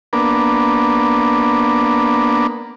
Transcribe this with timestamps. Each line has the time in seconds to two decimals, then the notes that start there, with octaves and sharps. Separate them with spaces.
0.13 A#3 B3 D4